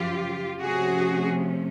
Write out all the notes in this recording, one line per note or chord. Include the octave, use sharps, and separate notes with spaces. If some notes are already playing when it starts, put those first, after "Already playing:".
Already playing: F#2 C#3 F3 F4 G4
C3 F3 A3 C#4 F#4 G#4